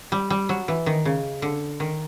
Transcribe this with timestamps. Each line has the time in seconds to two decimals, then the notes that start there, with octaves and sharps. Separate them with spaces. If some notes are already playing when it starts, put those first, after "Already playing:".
0.12 G3
0.30 G3
0.49 F#3
0.68 E3
0.86 D#3
1.05 C#3
1.42 D3
1.80 D#3